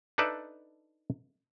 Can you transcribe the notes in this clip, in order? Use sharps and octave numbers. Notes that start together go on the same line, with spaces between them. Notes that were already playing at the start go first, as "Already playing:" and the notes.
D4 D#4 A4 B4 D5 E5